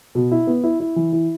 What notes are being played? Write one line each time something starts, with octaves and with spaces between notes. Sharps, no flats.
B2
E4
B3
E4
E4
E3
E4